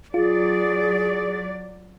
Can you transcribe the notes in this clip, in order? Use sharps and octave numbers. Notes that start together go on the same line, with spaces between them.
F#3 F4 G#4 D5